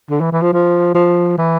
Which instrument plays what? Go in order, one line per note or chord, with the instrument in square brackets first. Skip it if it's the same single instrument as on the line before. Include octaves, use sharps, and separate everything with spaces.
[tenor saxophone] D3
E3
E3
F3
F3
F3
E3